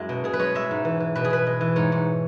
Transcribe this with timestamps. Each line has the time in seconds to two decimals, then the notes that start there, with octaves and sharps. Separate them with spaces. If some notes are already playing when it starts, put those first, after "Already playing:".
Already playing: F#2 F#3 G#3 E4 F#4
0.09 B2
0.24 B2 G#4
0.33 B4
0.39 G#3 C#5
0.55 G#3 E5
0.71 G#2
0.85 E3
1.00 E3
1.15 B2 B4
1.24 G#4
1.30 B2 B4
1.47 G#3
1.61 E3
1.76 G#2 C#5
1.92 G#2